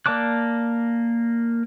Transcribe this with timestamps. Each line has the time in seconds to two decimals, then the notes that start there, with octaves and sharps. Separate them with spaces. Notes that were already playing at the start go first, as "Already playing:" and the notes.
0.06 A#3 D5 A5 D6 F#6